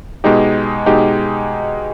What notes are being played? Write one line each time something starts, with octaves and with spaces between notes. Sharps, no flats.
B2 G#3 D#4 G4
B2 G#3 D#4 G4